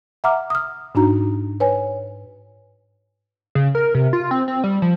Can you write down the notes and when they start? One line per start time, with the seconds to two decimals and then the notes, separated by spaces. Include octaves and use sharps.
0.24 E5 F#5 A#5 D6 F6
0.50 D#6 F6
0.95 G#2 D4 D#4 F#4 A#5
1.60 B4 C#5 G#5
3.55 C#3
3.75 A#4
3.95 C3
4.13 F4
4.31 C4
4.48 C4
4.64 G3
4.82 F3